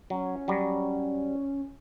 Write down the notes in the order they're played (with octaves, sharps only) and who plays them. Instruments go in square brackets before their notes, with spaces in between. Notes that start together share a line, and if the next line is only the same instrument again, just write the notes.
[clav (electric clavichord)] F#3 [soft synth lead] C#4
[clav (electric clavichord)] F#3 G3